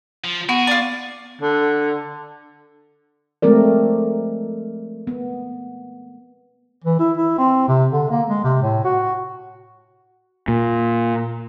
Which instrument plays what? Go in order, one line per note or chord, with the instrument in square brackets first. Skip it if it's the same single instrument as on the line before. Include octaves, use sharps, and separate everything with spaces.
[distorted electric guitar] F3
[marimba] B3 [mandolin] F#4 [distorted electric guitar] G#4
[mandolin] F4 D5
[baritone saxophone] D3
[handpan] F3 G#3 A3 C4 A#4 D5
B3
[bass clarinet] E3
E4
E4
C4
C3
D3
A#3
G#3
C3
A2
F#4
[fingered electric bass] A#2